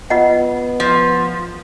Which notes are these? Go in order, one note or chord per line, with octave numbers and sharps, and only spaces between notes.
B3 F4 D#5 F#5
F3